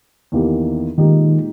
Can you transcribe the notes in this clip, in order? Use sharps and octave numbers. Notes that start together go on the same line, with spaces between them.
E2 D#3 A#3 E4 G4
A#2 D#3 G#3 D#4 G4